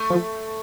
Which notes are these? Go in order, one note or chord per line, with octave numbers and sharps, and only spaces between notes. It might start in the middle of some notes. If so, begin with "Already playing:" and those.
Already playing: A3
F3